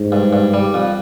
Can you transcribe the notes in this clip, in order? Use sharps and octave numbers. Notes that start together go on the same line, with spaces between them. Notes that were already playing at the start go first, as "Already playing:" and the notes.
Already playing: G#2
G2
G2
G3
F2